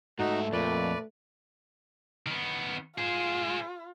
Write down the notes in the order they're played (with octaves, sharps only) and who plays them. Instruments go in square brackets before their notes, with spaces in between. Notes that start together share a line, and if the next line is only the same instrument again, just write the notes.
[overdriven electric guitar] G#2 E5 [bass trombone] A3 [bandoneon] D#4 [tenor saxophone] F#4
[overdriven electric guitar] F2 [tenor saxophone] A#2 [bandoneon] B4 D5
[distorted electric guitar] D#3 B3
[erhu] F4 [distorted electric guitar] G#4 C5